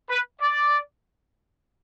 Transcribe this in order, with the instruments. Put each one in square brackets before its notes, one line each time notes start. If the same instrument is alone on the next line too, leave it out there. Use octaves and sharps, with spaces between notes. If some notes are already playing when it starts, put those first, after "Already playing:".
[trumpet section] B4
D5